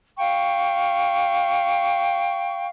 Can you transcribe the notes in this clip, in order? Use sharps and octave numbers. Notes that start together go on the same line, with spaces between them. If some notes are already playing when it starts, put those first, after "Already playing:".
F5 G5 C#6